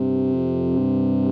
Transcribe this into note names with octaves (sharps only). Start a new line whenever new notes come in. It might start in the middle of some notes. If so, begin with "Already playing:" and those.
Already playing: G2 C3
F2
G2